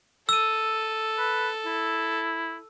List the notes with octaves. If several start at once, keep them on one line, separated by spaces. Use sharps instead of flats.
A4 E6 D#7
B4
E4